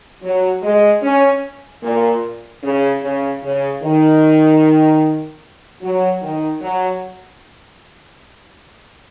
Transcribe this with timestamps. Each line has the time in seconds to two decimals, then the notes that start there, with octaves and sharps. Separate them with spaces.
0.22 F#3
0.62 G#3
1.02 C#4
1.83 A#2
2.63 C#3
3.02 C#3
3.43 C#3
3.82 D#3
5.81 F#3
6.22 D#3
6.61 F#3